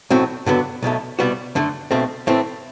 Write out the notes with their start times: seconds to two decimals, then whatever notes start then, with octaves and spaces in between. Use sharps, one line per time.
0.10 B1 A2 F#3 C4 F#4
0.46 G2 D3 F#3 B3 F#4
0.82 B1 B2 F#3 A3
1.19 C2 B2 G3 B3 F#4
1.55 F#2 D3 A3
1.91 B1 B2 A3 C4
2.27 A2 E3 A3 C4